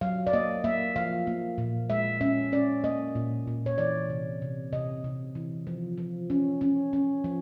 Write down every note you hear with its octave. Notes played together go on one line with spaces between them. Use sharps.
F#3 F5
D5
A#3 D#5
A#3 E5
F3 F5
A#3
A#2
G#3 E5
C#4 E5
C#4 D5
A#3 D#5
A#2
A#2
C#5
E3 D5
C3
C3
C3 D#5
C3
E3
F3
F3
C#4
C#4
C#4
F3